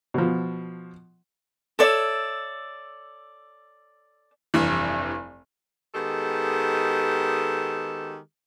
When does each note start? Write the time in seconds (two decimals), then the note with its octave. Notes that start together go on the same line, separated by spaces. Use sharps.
0.14 B2 F3
1.79 A4 C#5 D5 E5
4.54 F1 G2 E3
5.94 D#3 G#3 B3 G4 A4